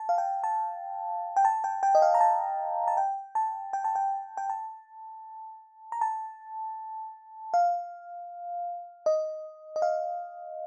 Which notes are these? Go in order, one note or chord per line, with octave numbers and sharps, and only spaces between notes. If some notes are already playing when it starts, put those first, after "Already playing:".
Already playing: A5
F5
G5
A5
G5
A5
G5
G5
D#5
F5
A#5
A5
A5
G5
A5
G5
A5
G5
G5
A5
A#5
A5
F5
D#5
D#5
F5